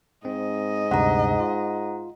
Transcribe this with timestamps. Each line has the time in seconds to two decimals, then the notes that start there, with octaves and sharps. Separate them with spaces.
0.25 G#2 C4 D#5
0.91 D2 G2 C3 F#5 A#5
1.40 F4